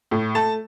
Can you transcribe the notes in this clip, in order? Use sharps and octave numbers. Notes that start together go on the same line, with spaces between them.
A2
A3 A5